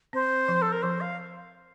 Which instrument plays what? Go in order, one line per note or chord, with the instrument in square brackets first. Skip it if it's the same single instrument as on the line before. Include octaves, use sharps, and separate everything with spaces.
[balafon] C4 [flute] C5
[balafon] F3
[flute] A4
A#4
[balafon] F3 [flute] C5
[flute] F5